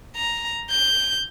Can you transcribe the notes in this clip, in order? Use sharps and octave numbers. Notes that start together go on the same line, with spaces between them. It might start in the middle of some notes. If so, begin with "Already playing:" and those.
A#5
G6